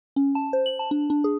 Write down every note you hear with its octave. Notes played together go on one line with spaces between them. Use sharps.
C#4
A5
C5
F#7
A5
D4
D4
G#4